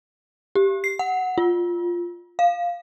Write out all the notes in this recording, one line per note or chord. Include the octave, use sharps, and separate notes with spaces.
G4
C7
F#5
F4
F5